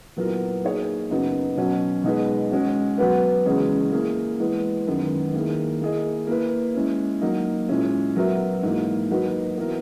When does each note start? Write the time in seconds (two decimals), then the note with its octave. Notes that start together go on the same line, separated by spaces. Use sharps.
0.16 A#2 F#3 B3 E4 A#4
0.64 A#3 D#4 G#4 C#5
1.10 F#2 C#3 F#3 B3 D#4
1.57 B2 F#3 C#4
2.04 B2 G#3 D#4 G#4 B4
2.51 G#3 C#4 F#4
2.98 F#3 B3 F#4 B4
3.46 E2 C#3 G#3 C#4 G#4
3.92 A#3 E4 G#4
4.40 E3 G#3 B3 E4 B4
4.87 F#2 D#3 G#3 B3
5.33 D#3 A#3 E4 G#4
5.81 A#3 E4 G#4 D#5
6.27 A#3 E4 B4
6.74 G#3 C#4 E4
7.21 F#3 A#3 D#4
7.69 A#2 G#3 C#4 E4
8.16 F#3 B3 F#4 A#4 E5
8.63 G#2 E3 A#3
9.10 F#3 A#3 D#4 F#4 B4
9.57 E3 B3 E4 A#4